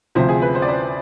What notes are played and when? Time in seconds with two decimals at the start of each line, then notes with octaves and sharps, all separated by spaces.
0.15 D2 C3 F3 C5
0.28 G#4
0.42 B4
0.55 C5
0.62 D5
0.68 C5